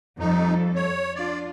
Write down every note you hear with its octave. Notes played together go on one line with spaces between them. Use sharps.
F2 G3 D#4 A4
C#5
D4 F4 D5